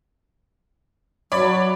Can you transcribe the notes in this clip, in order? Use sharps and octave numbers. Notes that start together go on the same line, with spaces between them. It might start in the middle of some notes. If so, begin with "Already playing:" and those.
F#3 C#5 D5 B5